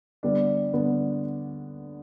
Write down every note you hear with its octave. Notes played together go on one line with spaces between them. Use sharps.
D3 G3 B3 D4
D3 G3 B3 D4